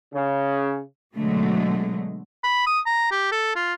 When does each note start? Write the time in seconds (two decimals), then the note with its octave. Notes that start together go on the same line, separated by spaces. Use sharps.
0.13 C#3
1.16 B2 D3 F#3 G#3 A3
2.44 B5
2.67 D#6
2.86 A#5
3.11 G4
3.32 A4
3.56 F4